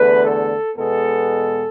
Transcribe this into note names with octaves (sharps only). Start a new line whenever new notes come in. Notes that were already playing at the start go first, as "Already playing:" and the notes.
Already playing: E2 D3 A3 B4
A4
E2 B2 G#3 B3 A4